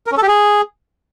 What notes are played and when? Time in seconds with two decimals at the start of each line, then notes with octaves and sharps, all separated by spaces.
0.07 A#4
0.12 C#4
0.17 A4
0.22 G4
0.28 G#4